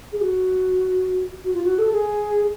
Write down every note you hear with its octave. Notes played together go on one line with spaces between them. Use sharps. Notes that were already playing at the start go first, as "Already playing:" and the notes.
G#4
F#4
F#4
F4
F#4
A4
G#4